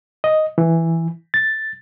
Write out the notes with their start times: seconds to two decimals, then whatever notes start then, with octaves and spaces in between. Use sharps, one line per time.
0.24 D#5
0.58 E3
1.34 A6